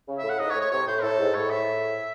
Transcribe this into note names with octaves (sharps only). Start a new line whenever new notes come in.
C#3
E5
A2
F#5
G#2 D#5
C#5
A2
C#5
C3 C#5
A2 C5
A2 A4
G#2
A2 C#5
E5